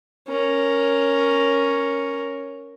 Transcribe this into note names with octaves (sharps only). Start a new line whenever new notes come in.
C#4 A#4